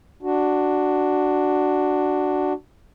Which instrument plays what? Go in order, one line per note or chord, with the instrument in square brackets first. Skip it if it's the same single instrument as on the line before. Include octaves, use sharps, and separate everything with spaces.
[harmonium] D4 F#4